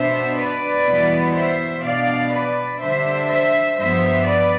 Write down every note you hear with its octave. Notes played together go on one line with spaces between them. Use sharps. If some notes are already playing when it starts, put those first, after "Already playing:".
Already playing: B2 B3 D4 C5 E5
B4 D5
E2 B2 G3 B3 E4
C5 E5
B2 B3 D4 D5 F5
B4 D5
D3 G3 D4 C5 E5
C5 E5
G2 F3 B3 C5 E5
B4 D5